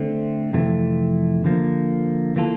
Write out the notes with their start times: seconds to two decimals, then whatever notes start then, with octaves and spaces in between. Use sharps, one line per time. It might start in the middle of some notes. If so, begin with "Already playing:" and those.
Already playing: D3 A3 C4
0.53 F2 C3 E3 A3
1.44 D3 F3 A#3
2.36 E3 A#3 F4 A4